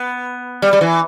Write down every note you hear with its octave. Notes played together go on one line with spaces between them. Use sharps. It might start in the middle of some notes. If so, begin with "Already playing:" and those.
Already playing: B3
G3
G3
E3